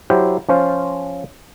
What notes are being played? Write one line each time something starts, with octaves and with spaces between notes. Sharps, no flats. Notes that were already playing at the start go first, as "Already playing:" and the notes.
F#3 E4 G4 C5
F3 C#4 F4 C5